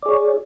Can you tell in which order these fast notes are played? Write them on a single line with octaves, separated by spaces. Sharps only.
D5 G#4 C#5